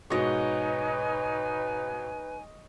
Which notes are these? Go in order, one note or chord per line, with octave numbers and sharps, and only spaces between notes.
G#2 B2 D#4 B4 C#5 D#5 G#5